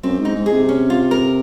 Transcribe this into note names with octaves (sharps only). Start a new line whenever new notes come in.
F#2 C4
G#2
D#4
G#2
G#4
C3
C#4
F4
A#4